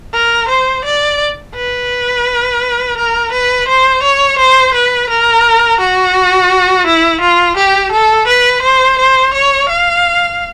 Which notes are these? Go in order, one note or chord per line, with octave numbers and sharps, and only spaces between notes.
A#4
C5
D5
B4
A#4
B4
C5
C#5
C5
B4
A#4
F#4
E4
F4
G4
A4
B4
C5
C5
C#5
F5